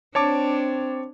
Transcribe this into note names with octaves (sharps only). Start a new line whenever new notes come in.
C4 D4 C#5 A5 D6